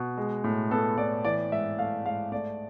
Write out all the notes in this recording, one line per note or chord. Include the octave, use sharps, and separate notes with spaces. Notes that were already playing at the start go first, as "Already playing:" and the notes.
Already playing: B2
G#3
A2
B3 A4
A2 D5
E3 D5
G#2 E5
A3 F5
G#2 F5
A3 D5